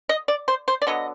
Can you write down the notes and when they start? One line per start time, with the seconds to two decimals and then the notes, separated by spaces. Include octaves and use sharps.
0.09 D#5
0.28 D5
0.48 C5
0.68 C5
0.82 D5
0.87 D3 F#3 B3 D#5